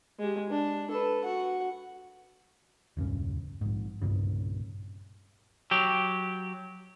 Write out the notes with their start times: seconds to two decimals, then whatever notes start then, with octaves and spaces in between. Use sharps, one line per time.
0.19 G#3 G4
0.50 D4
0.90 A4 B4
1.24 F#4 F#5
2.97 E1 C#2 G2 C#4
3.61 A#1 G#2
4.02 C2 G2 A#2 C#3
5.71 F#3 G4